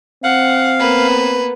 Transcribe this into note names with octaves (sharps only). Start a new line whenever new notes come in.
C4 F5 F#5
A#3 B3 B4